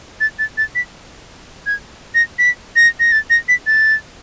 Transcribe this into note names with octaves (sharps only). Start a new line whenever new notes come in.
A6
A6
A6
B6
G#6
A#6
B6
A#6
A#6
A6
A#6
B6
A6